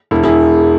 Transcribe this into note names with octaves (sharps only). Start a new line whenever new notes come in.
E1 E4
E4 G#4